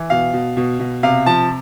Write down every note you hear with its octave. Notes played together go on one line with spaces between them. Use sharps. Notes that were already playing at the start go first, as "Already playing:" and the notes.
Already playing: E3
B2 F5
B2
B2
B2
C3 F5
F3 A5